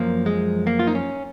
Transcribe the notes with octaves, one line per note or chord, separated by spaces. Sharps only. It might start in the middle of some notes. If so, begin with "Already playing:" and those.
Already playing: F#2 F3 A#3
G#3
A#3
F4
D#4
C#4